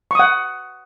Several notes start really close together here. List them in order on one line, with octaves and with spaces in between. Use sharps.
C#6 D#6 F#5